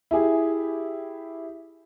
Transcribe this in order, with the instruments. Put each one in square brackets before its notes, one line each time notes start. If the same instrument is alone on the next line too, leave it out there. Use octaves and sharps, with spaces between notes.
[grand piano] E4 G4 G#4